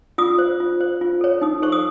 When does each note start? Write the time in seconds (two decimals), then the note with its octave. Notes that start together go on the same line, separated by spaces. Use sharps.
0.18 F4 D#6
0.39 C5
0.60 F4
0.80 C5
1.01 F4
1.21 A4 C#5
1.41 D#4 D#6
1.62 A4 C5 C#6
1.72 D#6